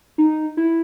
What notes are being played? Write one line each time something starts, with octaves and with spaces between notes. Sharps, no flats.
D#4
E4